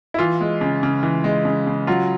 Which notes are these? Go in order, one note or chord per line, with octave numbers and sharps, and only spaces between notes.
E4
E3 F4
G#3
C#3
C#3
E3
G#3
C#3
C#3
F#3 F4